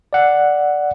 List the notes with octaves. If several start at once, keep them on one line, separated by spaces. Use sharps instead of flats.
D5 F#5